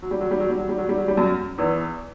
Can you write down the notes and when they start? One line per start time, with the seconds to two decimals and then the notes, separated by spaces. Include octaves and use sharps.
0.02 F#3
0.11 G3
0.21 F#3
0.31 G3
0.40 F#3
0.49 G3
0.59 F#3
0.69 G3
0.78 F#3
0.89 G3
0.98 F#3
1.08 G3
1.17 F#2 F#3
1.58 E2 E3